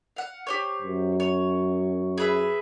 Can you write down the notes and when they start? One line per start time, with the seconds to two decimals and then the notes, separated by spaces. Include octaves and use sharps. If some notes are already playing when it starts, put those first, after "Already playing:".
0.16 F5 F#5
0.47 G4 C5 C#5
0.82 F#2
1.20 C#5
2.18 G#4 B4 E5